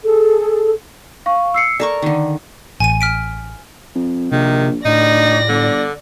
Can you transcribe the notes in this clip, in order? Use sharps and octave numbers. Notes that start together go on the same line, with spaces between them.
G#4 A4
F5 C#6
E6 C7 C#7
A4 A#4 D5 C#6
D3 D#3
A1 G#5 D#7
F6 B6 D7
F2
A#1 C3 D#3
D2 A2 D#4 D5 A#6
G1 D3